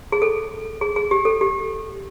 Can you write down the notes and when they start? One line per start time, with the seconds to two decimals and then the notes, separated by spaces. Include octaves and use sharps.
0.12 G#4
0.22 A4
0.81 G#4
0.96 G#4
1.11 G4
1.25 A4
1.41 G4